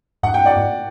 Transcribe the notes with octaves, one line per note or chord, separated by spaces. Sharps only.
G2 F#5
G5
D5 F#5